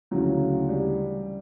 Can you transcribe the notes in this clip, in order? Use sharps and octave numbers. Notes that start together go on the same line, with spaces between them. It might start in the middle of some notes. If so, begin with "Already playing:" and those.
D2 C#3 E3 F#3
G3